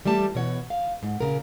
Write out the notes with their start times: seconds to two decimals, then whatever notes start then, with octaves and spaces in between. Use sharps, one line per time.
0.05 E3 G3 A3 G4 A5
0.35 B2 E3 C#5 F#5
0.70 F5
1.03 G#2
1.20 A#2 C#3 A#4